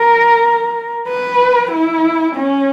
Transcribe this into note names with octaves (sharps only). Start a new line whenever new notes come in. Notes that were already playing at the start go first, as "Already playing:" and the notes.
Already playing: A#4
B4
E4
C#4